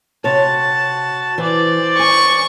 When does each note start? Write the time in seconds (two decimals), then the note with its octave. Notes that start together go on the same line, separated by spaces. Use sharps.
0.24 C3 F#4 C#5 A5
1.38 E3 C5 D5
1.99 G#5 C#6